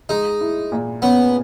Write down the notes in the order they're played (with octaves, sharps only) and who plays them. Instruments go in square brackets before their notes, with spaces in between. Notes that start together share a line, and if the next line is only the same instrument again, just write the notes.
[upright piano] G#3 [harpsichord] D#4
[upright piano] E4
A#2
[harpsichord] B3 [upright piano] C#4